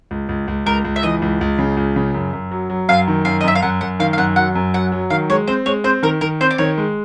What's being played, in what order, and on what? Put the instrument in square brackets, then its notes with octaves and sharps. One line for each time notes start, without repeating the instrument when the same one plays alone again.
[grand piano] C#2
C#2
C#2
[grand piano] C#2 [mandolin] A#4
[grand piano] C#2
[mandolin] E5
[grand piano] E3 [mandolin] D#5
[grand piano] C#2
C#2
C#3
C#2
C#3
F#2
F#2
F#3
F#3
[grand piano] F#2 [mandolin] F5
[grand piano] D#3
[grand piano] F#2 [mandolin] F5
[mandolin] D#5
[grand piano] F#2 [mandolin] E5
[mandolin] F5
[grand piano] F#2 [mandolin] F#5
[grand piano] F#2 [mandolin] F#5
[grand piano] D#3 [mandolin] F5
[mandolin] F5
[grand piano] F#2 [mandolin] F#5
[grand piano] F#3 [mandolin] F#5
[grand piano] F#2
[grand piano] F#3 [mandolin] F#5
[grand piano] F#3
[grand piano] D#3 [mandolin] F5
[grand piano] G#3 [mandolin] C#5
[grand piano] C4 [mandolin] C5
[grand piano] G#3 [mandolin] C#5
[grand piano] C4 [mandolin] C5
[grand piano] D#3 [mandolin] A#4
[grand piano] D#3 [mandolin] A#4
[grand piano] C4 [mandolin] C5
[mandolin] D5
[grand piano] D#3 [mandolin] C#5
[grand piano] G#3